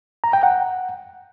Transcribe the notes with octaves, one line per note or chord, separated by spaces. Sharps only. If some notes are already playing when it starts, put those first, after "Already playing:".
A#5
G5
F#5